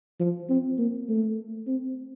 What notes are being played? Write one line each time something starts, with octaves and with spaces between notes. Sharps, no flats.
F3
C4
A#3
A3
C4